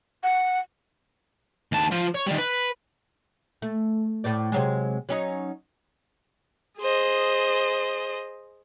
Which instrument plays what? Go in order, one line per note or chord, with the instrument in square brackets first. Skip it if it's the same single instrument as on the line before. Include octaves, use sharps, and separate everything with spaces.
[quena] F#5
[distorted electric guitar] D#2 A5
F3 F4
C#5
D#3 G3
B4
[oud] A3
A2 C5 D5
C3 F#3 G#3
F#3 C#4 D#4
[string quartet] G#4 C5 D#5